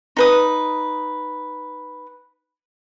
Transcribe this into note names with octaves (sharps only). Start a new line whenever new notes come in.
D#4 B4 D#6